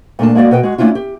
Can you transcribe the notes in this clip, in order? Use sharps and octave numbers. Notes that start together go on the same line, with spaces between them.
A#2 A3 D4 A5
G#3 A#3 F#4 D5 D#5
B2 B4 D#5 G5
G#3 F#4
A3 A#3 C#4 D4 E4 F4
G4